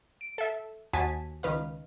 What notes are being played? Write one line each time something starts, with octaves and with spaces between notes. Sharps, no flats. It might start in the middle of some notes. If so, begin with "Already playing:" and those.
D7
A4 E5
D#2 F#4 G#5 A5 D#6 B6
C#2 D#3 B4 F5